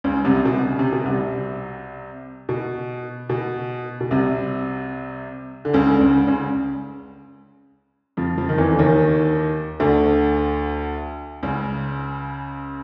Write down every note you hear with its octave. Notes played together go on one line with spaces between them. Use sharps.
C#2 C#3
C2 C3
B2
C#3
C3
B2
C2 C3
B2
B2
B2
C2 C3
D3
C#2 C#3
D3
C#2 C#3
C#2 C#3
F2 F3
F2 F3
D#3
E2 E3
D3
D#2 D#3
D2 D3
C#2 C#3